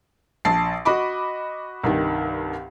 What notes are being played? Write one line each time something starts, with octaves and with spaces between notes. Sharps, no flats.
A#1 A5 C7
F#4 D#5 B5 D6
C2 G2 D#3